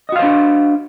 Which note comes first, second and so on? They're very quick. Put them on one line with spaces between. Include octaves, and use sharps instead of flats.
D#5 F#4 F5 C5 D4